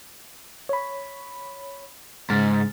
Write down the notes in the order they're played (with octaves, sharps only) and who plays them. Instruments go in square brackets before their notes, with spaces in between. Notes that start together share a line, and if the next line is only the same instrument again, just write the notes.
[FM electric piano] C#5 B5
[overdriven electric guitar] G#2 [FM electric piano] C#3 F6 A6